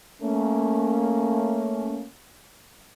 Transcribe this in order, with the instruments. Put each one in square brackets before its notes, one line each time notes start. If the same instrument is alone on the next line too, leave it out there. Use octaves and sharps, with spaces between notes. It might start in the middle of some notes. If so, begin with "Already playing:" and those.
[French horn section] A3 A#3 C#4